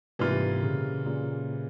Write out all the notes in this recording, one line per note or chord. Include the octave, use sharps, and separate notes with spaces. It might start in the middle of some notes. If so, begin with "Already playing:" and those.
G#2 C3 E3 G3 A#3 F4
A#2 C#3
A#2 C#3